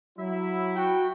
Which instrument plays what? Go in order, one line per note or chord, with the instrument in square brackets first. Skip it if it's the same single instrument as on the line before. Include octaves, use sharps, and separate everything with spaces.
[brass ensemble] F#3 E4 [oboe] E5
[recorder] F#4 [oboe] G5